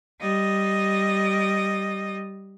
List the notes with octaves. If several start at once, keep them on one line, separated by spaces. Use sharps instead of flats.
G3 D#5